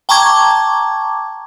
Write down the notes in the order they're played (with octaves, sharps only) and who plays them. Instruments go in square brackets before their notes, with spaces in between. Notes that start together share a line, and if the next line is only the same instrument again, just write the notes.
[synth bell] G5 A5 A#5 C#6 D6 G#6